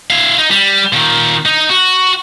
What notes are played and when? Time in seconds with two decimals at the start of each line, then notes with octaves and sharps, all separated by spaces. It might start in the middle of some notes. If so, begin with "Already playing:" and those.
0.10 E4 F5
0.38 D#4
0.51 G3
0.92 A#2 D#3
1.46 D#4
1.69 F#4